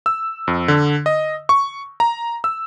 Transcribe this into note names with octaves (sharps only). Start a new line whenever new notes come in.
E6
F2
D3
D#5
C#6
A#5
E6